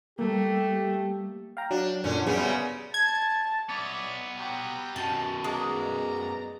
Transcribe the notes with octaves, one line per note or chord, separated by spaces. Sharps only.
G3 A3 A#3 G4
F5 G5 A#5
F#3 D4
F#2 A#2 D3 C#4
F#2 C#3 G3 B3 G#4
A5 G#6
B3 C#5 D5 E5
F#3 G3 G4
F#2 B2 A5
G#3 D5 A#5